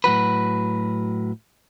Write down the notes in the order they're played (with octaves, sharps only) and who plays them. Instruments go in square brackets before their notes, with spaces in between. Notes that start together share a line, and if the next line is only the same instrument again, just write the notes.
[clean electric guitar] A2 F#3 F#4 B4